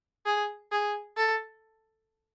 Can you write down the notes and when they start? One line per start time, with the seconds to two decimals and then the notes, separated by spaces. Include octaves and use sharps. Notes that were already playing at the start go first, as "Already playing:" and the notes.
0.26 G#4
0.72 G#4
1.17 A4